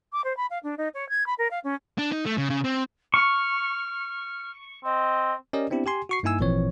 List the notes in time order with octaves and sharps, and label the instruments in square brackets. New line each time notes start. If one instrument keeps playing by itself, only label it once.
[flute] D6
C5
B5
F5
D4
D#4
C#5
G#6
B5
A#4
F5
C#4
[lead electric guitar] D4
D#4
A3
C#3
C#3
C4
[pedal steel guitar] C#6 [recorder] F6
[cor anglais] C4 [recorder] D#5
[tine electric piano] C#4 G4 A#4 D5 D#5
B3 C4 D4 E4 G4
G4 G#5 C6
F#4 C#6 C7
G2 A#3 D#4 E4 G#5 E6
G#1 A#2 E3 F3 C4 C#5